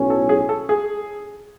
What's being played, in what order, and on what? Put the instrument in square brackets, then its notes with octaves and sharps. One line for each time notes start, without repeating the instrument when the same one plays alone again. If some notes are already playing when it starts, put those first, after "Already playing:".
Already playing: [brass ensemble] B1 A2 F#3 C#4
[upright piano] A4
G#4
A4
G#4